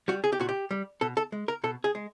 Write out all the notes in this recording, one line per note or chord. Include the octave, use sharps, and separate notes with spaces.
G3 F#4
G#4
G4
A#2 F#4
G4
G3
B2 A4
A4
G#3
A#4
B2 A4
G#4
G#3